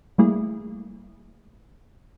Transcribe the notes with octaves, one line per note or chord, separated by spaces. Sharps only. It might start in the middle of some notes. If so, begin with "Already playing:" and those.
G3 A3 A#3 E4 G#4